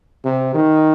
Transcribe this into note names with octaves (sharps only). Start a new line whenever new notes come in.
C3
D#3